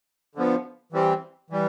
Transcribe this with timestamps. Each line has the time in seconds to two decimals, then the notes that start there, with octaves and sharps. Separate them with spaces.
0.35 D3 F3 B3
0.93 E3 G3 C4
1.50 E3 G3